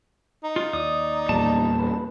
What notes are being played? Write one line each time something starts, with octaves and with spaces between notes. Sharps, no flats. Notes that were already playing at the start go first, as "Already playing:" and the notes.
D#4
F4
D#2 D5 D#6
E2 A#2 G3 A5
B4